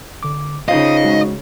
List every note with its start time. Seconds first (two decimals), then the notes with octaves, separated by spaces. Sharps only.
0.23 D3 D6
0.69 C#3 D#4 F4 C5 D#5 F5
1.04 G#3 F#4